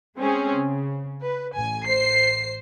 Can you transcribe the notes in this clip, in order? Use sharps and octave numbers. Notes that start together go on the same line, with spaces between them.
G#3 C4 C#4 G#4
C#3
B4
A1 G#5
C5 C7